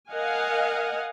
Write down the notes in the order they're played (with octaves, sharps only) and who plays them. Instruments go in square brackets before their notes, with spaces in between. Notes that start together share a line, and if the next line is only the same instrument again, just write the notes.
[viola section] A#4 D#5 F5 F#5 G#5